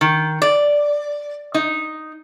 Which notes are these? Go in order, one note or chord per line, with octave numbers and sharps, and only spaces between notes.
D#3
D5
D#4